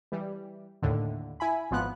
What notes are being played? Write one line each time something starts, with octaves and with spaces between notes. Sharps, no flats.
E3 G3
D#2 A2 D3
E4 G#5 B5
G#1 F3 B3 F#6